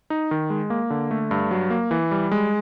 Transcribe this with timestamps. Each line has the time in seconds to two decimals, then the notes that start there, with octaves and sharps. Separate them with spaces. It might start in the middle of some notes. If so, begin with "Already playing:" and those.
0.10 D#4
0.31 D#3
0.50 G#3
0.70 A#3
0.90 D3
1.11 A3
1.31 G2
1.51 F#3
1.70 A#3
1.91 E3
2.11 G3
2.31 G#3